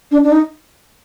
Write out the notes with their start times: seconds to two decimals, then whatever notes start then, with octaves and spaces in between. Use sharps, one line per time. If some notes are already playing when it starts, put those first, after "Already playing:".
0.11 D4
0.24 D4
0.32 D#4